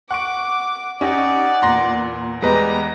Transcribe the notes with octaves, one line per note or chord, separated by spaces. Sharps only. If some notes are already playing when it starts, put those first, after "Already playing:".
F#5 C#6 D6 D7
C#4 D#4 G4 D5 F#5
E2 A#2 A#5 C6 A#6
E2 G3 G#3 B4 D#5 A#5